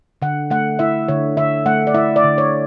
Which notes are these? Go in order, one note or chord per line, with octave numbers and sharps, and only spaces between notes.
D3 F#5
A3 F#5
E4 E5
D3 C#5
D3 E5
A3 F#5
D5
E4 E5
D5
D3
C#5